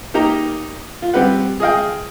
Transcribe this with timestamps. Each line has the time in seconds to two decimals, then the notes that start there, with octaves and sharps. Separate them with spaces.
0.14 A#3 D#4 G4 A#5
1.02 F4
1.14 G3 C4 G4 B4 F#5
1.60 G#4 D#5 F5 G5